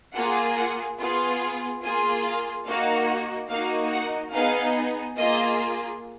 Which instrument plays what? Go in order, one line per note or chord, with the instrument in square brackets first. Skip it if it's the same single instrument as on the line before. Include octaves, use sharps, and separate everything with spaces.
[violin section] A#3 F4 G#4 F#5
F#5
B3 F4 G#4
A#3 F4 G#4 G#5
F5
A#3 D#4 F#4 F5
A#3 D#4 F#4 F5
F#5
B3 D#4 G#4 F5
A#3 F4 G#4 D#5